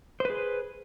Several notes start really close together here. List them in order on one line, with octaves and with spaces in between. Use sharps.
C5 B4 G#4